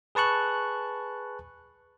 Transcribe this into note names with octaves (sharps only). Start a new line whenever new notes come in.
G#4 B4 A5 C#6 F#6